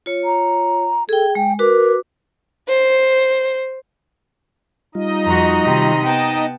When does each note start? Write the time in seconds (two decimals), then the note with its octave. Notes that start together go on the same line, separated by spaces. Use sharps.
0.06 F4 C#5
0.25 A#5
1.09 G#4 A4 G5
1.35 G#3 G5
1.59 F#4 A#4 B4 D6
2.68 C5
4.95 G3 D#4 F4 D#5
5.25 F2 F#4 A#5
5.63 C3 D#3
6.05 B3 G5 A5